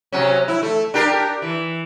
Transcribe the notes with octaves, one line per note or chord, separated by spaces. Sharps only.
C3 F#3 C#4
E4
A3
D4 G4 A#4
E3